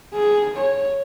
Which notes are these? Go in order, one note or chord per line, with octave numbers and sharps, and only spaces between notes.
G#4
C#5